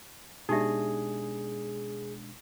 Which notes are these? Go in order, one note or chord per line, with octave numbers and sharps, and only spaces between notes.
B2 G#3 D4 D#4 G4 G#4 E5